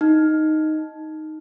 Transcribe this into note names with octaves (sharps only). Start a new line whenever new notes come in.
D#4